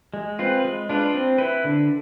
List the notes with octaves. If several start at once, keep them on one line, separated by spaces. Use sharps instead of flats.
G#3
C4 F4 B4
G#3
D4 F4 B4
C4
E4 B4
D3